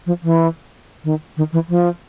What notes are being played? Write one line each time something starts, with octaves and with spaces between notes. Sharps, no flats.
F3
E3
D#3
D#3
E3
F3